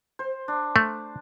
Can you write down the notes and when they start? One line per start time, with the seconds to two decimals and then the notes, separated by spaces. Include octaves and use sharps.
0.19 C5
0.48 D4
0.76 A3